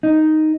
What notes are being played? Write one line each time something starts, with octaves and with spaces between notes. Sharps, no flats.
D#4